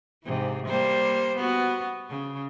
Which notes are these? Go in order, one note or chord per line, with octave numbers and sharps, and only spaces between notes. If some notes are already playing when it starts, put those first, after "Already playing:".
G#2 C3 E3
G3 A#3 C5
B3 F#4
C#3